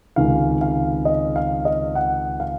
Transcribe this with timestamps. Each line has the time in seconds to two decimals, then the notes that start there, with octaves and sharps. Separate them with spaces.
0.16 C#2 C3 D#3 F5
0.61 F5
1.05 D#5
1.36 F5
1.65 D#5
1.95 F#5
2.40 F5